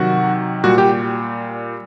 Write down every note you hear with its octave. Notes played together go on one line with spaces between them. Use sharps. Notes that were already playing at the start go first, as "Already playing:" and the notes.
Already playing: C3 D#3 F#3 F#4 F#5
A#2 G3 F#4 F#5
G4 G5